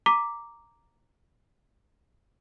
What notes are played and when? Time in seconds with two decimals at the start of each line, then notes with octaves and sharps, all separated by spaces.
0.06 A#5 D6 B6